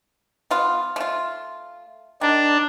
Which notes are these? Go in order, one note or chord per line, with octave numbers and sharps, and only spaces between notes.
B3 F4
A3 F4
D#3 D4